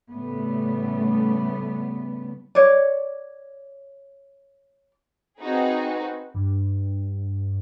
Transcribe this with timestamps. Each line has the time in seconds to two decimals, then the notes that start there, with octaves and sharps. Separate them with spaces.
0.11 A2 C#3 G3 A3 B3
2.55 C#5 D5
5.39 C4 D#4 F#4 G#4 B4
6.34 G2